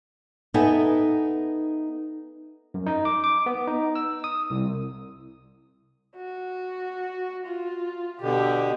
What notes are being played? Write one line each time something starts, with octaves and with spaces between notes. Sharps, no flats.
B3 D#4 A4 E5 G5 G#5
F#2
D#4
D6
D6
B3
D#4
E6
D#6
C2
F#4
F4
B2 D3 G4